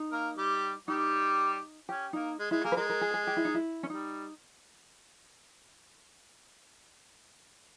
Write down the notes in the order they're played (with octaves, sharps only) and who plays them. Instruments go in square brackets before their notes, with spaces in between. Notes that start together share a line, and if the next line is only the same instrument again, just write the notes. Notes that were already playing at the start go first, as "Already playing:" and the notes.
Already playing: [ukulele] D#4
[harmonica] A#3 A#4
G3 G4
[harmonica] G3 G4 [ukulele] D#4
[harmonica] C#4 [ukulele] G4
[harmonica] A#3 [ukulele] D#4
[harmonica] G#3
[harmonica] G#3 [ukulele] E4
[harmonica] A#3 [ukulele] G#4
[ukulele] B4
[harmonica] G#3 [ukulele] A#4
[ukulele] A#4
G#4
G#4
G4
E4
D#4
E4
C#4
[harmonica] G3 [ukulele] D#4